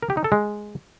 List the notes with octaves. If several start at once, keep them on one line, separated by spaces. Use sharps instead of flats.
A#4
G4
D#4
A4
G#3